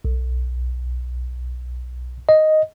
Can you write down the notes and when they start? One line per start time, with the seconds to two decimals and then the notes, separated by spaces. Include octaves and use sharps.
0.05 B1
2.29 D#5